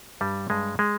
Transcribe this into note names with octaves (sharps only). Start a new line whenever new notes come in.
G2 G3
G2 G#3
G#3